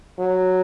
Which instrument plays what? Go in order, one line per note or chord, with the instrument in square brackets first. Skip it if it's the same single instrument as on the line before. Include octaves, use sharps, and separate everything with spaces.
[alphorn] F#3